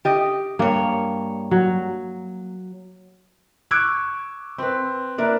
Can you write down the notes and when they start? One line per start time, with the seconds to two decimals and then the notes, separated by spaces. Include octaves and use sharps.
0.05 G4 D#5
0.59 G2 A#3 C#5
1.51 F#3
3.71 C#6 D6 E6 F#6 G#6 D7
4.58 C4 B4
5.18 A#3 D4 A#4 B4 E5